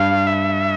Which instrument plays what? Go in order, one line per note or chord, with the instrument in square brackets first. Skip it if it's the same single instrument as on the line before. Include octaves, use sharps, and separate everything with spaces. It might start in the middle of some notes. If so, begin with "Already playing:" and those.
Already playing: [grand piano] G2 [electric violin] F5
[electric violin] E5